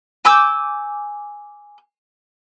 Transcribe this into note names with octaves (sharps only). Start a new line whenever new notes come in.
G#5 D6 E6 G6